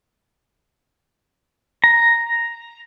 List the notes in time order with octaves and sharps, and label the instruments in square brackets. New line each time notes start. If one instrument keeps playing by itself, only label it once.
[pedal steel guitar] A#5